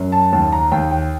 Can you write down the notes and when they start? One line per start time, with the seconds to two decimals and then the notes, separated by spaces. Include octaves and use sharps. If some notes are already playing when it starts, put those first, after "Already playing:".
Already playing: F#2
0.12 A5
0.33 D#2 A5
0.53 A#5
0.72 D#2 G5
0.91 G5